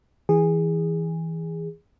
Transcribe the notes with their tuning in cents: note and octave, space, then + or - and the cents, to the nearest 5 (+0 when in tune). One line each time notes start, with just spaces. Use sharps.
E3 -20 G#4 -15